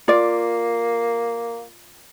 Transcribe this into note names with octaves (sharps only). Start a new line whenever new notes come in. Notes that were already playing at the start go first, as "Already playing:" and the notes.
A#3 F4 D5